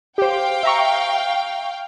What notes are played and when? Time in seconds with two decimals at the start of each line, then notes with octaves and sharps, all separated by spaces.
0.18 G4 C5 F5 G5
0.63 E5 A#5 C#6